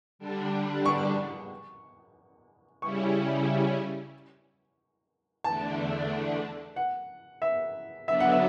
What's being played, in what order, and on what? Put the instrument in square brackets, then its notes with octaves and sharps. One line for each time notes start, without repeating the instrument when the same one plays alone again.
[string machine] D3 G3 D4
[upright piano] C#6
[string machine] C#3 G3 C#4 E4 [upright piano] C#6
[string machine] E2 D3 A3 D4 [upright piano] A5
[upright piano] F#5
E5
[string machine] D3 F#3 B3 D4 [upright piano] E5
[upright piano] F#5
E5